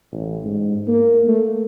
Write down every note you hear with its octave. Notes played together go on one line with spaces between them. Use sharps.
A1
G#2
A#3
A3